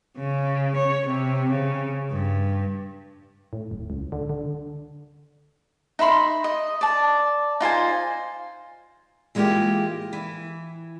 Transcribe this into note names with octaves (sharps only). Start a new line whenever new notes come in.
C#3
C#5
C3
C#3
G2
A2
D1
C#2
D3
D3
D#4 E5 B5 C6
D#5
D5 A5
D#4 F4 C5 G#5
E3 G#3 A#3 D#4 F4 G4
E3